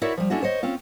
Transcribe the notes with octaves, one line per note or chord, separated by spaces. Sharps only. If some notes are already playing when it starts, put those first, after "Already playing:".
E4 F#4 A#4 C#5 D5 E5
F3 G3
A3 C#4 D4 E4 F#4
C5 C#5 D#5
C4 C#4 F4